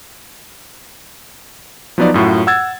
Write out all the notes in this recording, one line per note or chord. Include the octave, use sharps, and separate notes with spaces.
F3 F#3 B3 D#4 D5
F#2 A2 F4 F#4
F#5 E6 G#6 A6